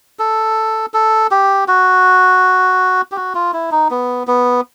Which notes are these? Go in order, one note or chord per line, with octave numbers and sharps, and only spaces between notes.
A4
A4
G4
F#4
G4
F#4
F4
E4
D#4
B3
B3